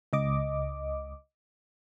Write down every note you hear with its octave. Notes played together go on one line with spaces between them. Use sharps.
C#2 D#5 D6